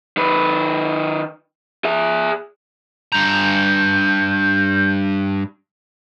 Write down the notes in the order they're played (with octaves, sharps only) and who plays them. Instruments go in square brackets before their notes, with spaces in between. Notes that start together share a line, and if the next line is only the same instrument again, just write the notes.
[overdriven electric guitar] D#3 B4
G#4 E5
[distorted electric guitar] G2 A#5 [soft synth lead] G6